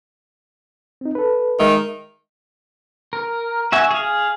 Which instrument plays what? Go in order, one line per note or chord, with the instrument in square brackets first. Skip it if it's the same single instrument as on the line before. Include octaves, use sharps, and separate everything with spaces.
[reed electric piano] C4 D#4
A4 B4
[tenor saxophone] D#3 [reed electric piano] G#3 E5
[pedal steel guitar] A#4
F#4 E5 G#5
G#4 F5